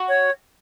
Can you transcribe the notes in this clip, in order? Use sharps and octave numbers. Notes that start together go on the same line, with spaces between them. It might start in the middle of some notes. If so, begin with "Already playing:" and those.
Already playing: F#4
C#5